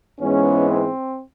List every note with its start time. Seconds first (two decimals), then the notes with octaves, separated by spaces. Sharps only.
0.19 G#2 E3 G#3 B3 C#4
0.69 C4